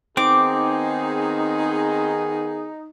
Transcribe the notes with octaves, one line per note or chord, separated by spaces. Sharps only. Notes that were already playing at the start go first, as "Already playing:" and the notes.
D#3 B3 C4 D#4 G#4 D6